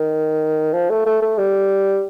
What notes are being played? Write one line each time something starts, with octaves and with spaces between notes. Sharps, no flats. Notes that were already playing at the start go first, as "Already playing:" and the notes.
Already playing: D#3
F3
A3
A3
A3
G3